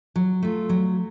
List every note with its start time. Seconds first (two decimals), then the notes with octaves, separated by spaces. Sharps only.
0.16 F#3
0.43 A3 F4
0.69 F#3